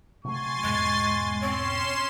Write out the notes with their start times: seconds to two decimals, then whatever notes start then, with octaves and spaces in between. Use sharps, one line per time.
0.25 C3 F#3 A3 G#5 C6 C#6 A6
0.63 E2 G#2 B2 G#3
1.42 C4 C#4 C#5 C6 E7